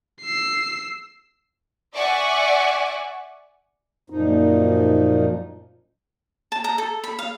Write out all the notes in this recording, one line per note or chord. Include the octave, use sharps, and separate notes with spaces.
E6 C7
D5 E5 F#5 G#5 C#6
F#2 A#2 F3 D#4
A5
A#5
A4
B5
F5